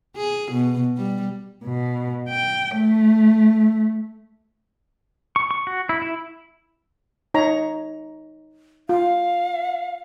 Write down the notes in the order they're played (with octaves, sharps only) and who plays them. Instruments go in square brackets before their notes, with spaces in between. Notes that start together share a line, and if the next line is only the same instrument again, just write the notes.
[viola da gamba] G#4
B2
G3
[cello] B2
G5
A3
[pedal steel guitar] C#6
C#6
F#4
E4
E4
[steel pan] D#4 C#5 A#5
[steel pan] F4 [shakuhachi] F5